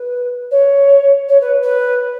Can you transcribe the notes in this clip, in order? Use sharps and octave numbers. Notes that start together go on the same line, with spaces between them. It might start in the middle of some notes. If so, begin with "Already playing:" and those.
Already playing: B4
C#5
C#5
B4
B4